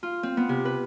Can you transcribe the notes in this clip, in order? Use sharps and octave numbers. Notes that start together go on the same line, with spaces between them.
F4
C4
B3
C3
B4